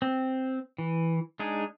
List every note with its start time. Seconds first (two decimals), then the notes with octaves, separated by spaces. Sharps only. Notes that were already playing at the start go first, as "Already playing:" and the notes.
0.02 C4
0.78 E3
1.39 G#3 D4 D#4 G#4